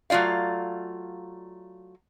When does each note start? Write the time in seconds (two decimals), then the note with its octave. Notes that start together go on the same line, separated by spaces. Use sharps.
0.10 F#3 A3 F4 D5 F5